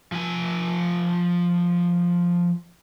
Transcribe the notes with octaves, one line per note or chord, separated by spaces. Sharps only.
F3 G#5